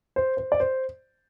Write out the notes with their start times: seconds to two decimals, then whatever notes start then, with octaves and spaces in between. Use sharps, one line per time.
0.16 C5
0.37 C5
0.52 D5
0.60 C5